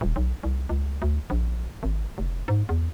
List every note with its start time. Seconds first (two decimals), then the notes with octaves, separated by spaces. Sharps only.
0.01 D#1
0.16 B1
0.43 C2
0.69 C#2
1.02 D2
1.30 A#1
1.83 G#1
2.18 F1
2.48 G#2
2.69 E2